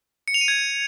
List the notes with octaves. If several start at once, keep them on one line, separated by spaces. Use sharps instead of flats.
C#7
F7
D#7
G#6